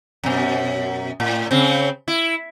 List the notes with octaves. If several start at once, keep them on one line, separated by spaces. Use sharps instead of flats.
F#2 B2
A2
C#3 C4
E4